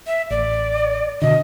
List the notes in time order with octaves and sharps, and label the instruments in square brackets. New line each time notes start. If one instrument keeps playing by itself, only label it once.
[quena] E5
[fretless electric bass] A1 [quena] D5
[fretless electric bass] B2 D3 [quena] D#5